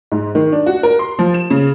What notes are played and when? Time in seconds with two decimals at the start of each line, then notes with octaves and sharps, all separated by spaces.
0.12 G#2
0.35 D#3
0.52 D4
0.66 F#4
0.83 A#4
0.99 C6
1.19 F3
1.34 E7
1.50 C#3